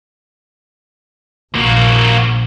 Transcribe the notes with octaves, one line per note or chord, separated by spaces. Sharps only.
A#1 A#3 F#4